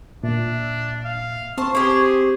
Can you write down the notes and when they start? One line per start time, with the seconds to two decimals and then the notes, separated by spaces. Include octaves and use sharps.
0.24 A#2 D4 E5
1.04 E5 F5
1.58 C4 C5 A5 C#6
1.75 G4 G#4 C5